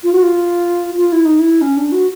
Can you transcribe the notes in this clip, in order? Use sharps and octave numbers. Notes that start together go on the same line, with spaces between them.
F4
F#4
F4
F4
E4
D#4
E4
C#4
D4
F#4